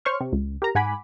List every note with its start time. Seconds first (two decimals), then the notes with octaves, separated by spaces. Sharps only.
0.05 C5 C#5 C6 C#6 F6
0.21 C3
0.33 C#2
0.62 G4 A#4 A#5
0.75 G#2 F#5 G#5 B5 D6